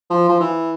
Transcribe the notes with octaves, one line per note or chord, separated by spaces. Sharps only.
F3
F3
E3